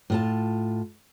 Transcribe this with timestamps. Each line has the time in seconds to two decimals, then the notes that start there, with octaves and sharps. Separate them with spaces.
0.10 A2 F4 A5